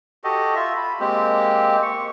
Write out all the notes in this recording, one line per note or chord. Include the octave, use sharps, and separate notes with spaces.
F#4 G4 A4 D#5
F4 E5
B5
G#3 A#3 C4 G4
C#6